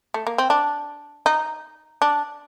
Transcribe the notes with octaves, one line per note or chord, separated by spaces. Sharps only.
A3
A#3
C4
D4
D#4
D4